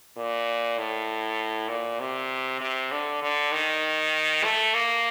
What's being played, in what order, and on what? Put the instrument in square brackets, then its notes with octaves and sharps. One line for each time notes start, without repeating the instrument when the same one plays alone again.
[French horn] A#2
A2
A#2
C3
C3
D3
D3
D#3
A3
A#3